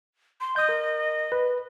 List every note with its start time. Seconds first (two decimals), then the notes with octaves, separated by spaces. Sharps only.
0.40 C6
0.56 D#5 D#6 G6
0.69 A#4
1.32 B4